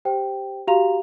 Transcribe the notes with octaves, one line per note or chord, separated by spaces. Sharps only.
G4 C5 G5
F#4 G4 F5 A#5 F7